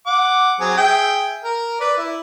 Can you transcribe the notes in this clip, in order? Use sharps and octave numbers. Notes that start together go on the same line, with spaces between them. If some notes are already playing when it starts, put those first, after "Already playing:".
F#5 D6
F#3 C4 G#4
G#4 E5 G5
A#4
B4 D5
E4